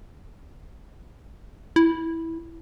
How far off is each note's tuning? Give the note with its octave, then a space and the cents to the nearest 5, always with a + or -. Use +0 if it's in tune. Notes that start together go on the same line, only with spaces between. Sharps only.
E4 -10